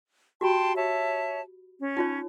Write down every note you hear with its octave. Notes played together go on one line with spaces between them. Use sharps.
F#4 G4 G5 A5 B5 C6
C#5 E5 A5
C#4
D#4 F4 C#5